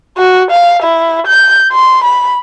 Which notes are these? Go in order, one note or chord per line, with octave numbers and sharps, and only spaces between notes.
F#4
F5
E4
G6
C6
B5